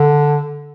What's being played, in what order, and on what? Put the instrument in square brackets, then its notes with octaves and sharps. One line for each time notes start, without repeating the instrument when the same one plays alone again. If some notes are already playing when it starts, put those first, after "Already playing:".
Already playing: [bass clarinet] D3